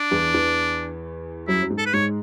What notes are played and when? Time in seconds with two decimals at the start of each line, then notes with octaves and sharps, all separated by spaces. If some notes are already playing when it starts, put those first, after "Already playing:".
Already playing: D4
0.11 E2 E3
0.34 E2 E3
1.48 F#2 F#3 E4
1.63 F#3
1.70 G#2 G#3
1.78 A4
1.86 B4
1.93 G#2 G#3 C#5